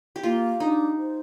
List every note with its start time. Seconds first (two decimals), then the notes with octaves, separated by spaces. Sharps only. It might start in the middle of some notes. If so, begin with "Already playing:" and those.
0.16 G4
0.23 A#3 F4
0.60 D4 D#4
0.97 C5